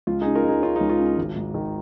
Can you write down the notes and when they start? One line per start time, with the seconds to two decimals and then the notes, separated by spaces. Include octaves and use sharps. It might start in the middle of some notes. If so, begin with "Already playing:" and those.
0.07 C#2 F4
0.21 C#3 D#4 G#4
0.35 F4 A#4
0.44 G#3 D#4 G#4
0.62 C#4 F4
0.76 C#2 D#4
0.90 F4
0.99 C#3
1.17 G#1
1.36 G#2
1.54 D#3